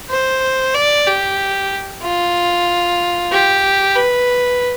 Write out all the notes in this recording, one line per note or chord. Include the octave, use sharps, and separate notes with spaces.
C5
D5
G4
F4
G4
B4